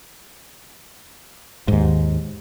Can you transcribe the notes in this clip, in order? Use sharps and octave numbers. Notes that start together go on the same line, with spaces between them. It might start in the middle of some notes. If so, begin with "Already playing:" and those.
D#2 G#2